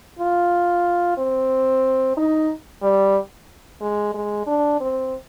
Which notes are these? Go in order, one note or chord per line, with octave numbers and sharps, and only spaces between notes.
F4
C4
D#4
G3
G#3
G#3
D4
C4